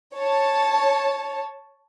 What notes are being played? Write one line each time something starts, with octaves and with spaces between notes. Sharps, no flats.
C#5 A5